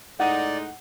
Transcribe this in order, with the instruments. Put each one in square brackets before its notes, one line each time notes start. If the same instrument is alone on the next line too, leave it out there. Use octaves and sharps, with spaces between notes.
[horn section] A2 G#3 D#4 [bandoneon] D5 [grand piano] F#5